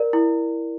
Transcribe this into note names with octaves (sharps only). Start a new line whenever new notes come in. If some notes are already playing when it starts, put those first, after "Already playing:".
Already playing: A#4 D5
E4